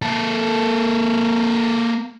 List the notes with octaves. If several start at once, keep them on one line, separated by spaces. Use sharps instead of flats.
A#3 A4